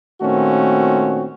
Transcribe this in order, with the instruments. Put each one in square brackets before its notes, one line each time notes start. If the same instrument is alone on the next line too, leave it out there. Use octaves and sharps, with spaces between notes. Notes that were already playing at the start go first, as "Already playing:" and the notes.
[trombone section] A#2 D#3 A3 C4 C#4 F#4